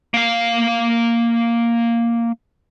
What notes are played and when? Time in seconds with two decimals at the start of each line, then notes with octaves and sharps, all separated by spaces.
0.14 A#3 F5